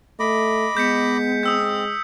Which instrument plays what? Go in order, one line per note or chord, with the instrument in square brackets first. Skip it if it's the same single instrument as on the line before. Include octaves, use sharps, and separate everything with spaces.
[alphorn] A3 [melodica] D#5 B5 D6
[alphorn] G#3 [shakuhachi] B3 [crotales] G6 B6 C#7
[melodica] C4 [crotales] D#6 E6 G6